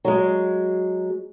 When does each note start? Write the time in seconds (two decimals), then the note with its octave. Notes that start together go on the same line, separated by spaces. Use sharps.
0.05 F#3 G#3